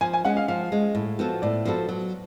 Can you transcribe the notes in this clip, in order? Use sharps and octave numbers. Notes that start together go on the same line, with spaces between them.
F3 G#5
G#5
G#3 C#4 F#5
F5
F3 F5
G#3 C#4
A2
F3 B3 F#4 A4
A2 D5
F3 B3 F#4 A4
F#3